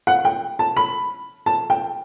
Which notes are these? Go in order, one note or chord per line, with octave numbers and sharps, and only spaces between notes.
F#5
G5
A5
B5
A5
G5